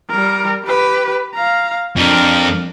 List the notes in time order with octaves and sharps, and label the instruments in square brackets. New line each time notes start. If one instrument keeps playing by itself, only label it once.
[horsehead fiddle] G3 A#4
G4 B4
F5 A#5
[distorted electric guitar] F2 [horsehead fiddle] D4 A#4